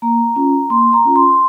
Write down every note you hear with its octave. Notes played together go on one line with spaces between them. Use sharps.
A#3 A#5
C#4 F4
A#3 C6
A#5
C#4 F4
C6